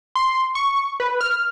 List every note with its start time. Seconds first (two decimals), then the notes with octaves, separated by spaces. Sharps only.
0.15 C6
0.55 C#6
1.00 B4
1.21 F6